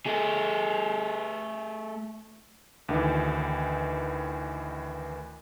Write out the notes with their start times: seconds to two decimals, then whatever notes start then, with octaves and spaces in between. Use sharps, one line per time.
0.06 A3 G#4
2.89 D2 D#3 E3